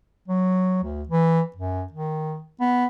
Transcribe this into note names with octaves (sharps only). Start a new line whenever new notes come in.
F#3
D2
E3
F#2
D#3
B3